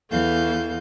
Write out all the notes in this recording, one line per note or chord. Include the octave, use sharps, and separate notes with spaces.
E2 E3 A4 F5 G6